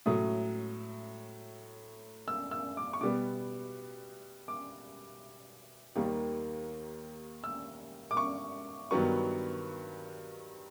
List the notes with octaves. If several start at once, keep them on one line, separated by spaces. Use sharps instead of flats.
A2 F#3 A3 D#6
E6
E6
D6
C#6
B2 G3 B3 D6
D6
D#2 D#3 G3 A#3
E6
D6
C#6
G2 D#3 F#3 B3 C#6